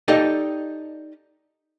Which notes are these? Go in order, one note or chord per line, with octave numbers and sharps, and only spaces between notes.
D#4 G4 A4 D5 D#5